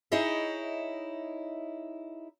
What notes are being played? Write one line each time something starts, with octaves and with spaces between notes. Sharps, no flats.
D#4 E4 G#4 C#5 D#5 E5